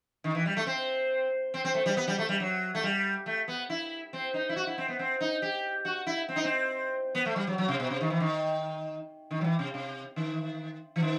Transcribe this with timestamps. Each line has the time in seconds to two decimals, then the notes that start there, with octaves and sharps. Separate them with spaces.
0.24 D#3
0.35 E3
0.46 G3
0.57 A3
0.67 C4
1.54 C4
1.65 C4
1.74 A3
1.86 G3
1.97 B3
2.08 G3
2.19 A3
2.29 G3
2.40 F#3
2.75 A3
2.83 G3
3.26 A3
3.48 B3
3.70 E4
4.13 C4
4.34 D#4
4.49 E4
4.56 F#4
4.67 E4
4.78 C4
4.88 B3
4.99 C4
5.21 D#4
5.42 G4
5.85 F#4
6.07 E4
6.29 C4
6.36 D#4
6.44 C4
7.15 B3
7.26 A3
7.36 G3
7.47 F#3
7.58 F#3
7.68 C3
7.80 B2
7.90 C3
8.01 D#3
8.10 E3
8.20 D#3
9.31 D#3
9.41 F#3
9.44 E3
9.59 C3
9.74 C3
10.16 D#3
10.96 E3
11.03 D#3